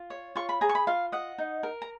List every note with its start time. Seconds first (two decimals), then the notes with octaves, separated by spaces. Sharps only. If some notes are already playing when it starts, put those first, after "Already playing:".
Already playing: F4
0.10 C#5
0.36 F4 C#6
0.49 B5
0.61 G#4 A#5
0.69 C#6
0.75 B5
0.87 F4 F5
1.12 D#5 F#5
1.38 D#4
1.63 A#4
1.82 A#5